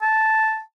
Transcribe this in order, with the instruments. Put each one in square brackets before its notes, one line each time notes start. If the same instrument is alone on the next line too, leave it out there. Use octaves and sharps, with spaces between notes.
[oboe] A5